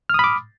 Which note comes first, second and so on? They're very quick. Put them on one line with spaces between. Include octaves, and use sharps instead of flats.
F6 D#6 B5 D6